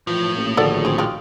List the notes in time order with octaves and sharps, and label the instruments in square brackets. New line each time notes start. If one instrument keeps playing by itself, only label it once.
[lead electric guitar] A2 [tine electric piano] E3 [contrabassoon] F3
[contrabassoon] A1 [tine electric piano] A#3
[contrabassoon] A#1 [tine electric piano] D3 D#3 F#4 [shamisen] A4 D5 F#5
[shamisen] C4 G#4
G#3 F4 G4